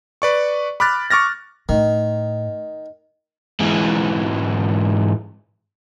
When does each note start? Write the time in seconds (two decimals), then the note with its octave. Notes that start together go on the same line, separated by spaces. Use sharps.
0.22 B4 D5 C#6
0.80 B5 D6 F6 F#6 A6
1.10 C#6 D6 F6 A6 A#6
1.69 A2 D#3
3.60 G#2 E3